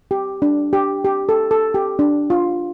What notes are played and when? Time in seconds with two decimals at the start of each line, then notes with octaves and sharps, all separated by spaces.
0.11 G4
0.42 D4
0.73 G4
1.05 G4
1.29 A4
1.51 A4
1.74 G4
1.99 D4
2.30 F4